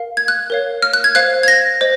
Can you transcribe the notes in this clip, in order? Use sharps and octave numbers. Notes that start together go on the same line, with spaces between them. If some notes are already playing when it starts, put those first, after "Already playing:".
Already playing: A#4 F5
G#6
F#6
A#4 C#5 F5
F6
F#6
G#6
C5 F5 F#6
G#6
A#6
C5 D#5